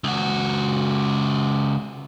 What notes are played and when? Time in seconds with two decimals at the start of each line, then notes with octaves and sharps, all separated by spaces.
0.04 C#2 F#4